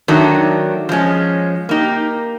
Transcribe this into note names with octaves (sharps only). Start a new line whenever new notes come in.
D#3 F#3 A3 D4
F3 G#3 C#4
A#3 D#4 G4